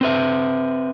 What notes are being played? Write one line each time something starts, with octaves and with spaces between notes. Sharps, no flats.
C4 B4 E5